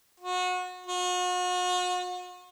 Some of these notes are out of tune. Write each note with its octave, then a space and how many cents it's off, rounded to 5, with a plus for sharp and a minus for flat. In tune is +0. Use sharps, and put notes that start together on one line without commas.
F#4 -30
F#4 -40